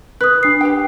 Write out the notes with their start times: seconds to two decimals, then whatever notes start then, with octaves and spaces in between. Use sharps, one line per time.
0.21 B4 D#6 F#6
0.43 D4 C7
0.61 G4 B4 G5